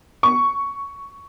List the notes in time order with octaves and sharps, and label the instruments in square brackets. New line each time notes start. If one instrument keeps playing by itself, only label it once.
[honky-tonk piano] C#6